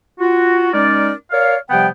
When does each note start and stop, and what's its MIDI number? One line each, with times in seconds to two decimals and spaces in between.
0.19 0.69 65
0.19 0.69 66
0.73 1.11 56
0.73 1.11 61
0.73 1.11 63
0.73 1.11 70
0.73 1.11 74
1.31 1.56 70
1.31 1.56 73
1.31 1.56 74
1.31 1.56 77
1.70 1.88 48
1.70 1.88 53
1.70 1.88 55
1.70 1.88 59
1.70 1.88 78
1.70 1.88 79